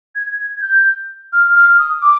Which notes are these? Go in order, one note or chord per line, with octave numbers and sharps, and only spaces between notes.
G#6
G#6
G6
F6
F6
D#6
D6